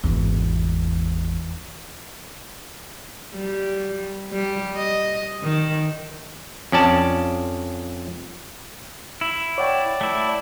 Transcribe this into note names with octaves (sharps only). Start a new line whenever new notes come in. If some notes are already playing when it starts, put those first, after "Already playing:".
G#1 E2
G3
G3
D#5
D#3
F2 C#4 D5 A5
E4
C#5 D5 F#5 G5
A3 E4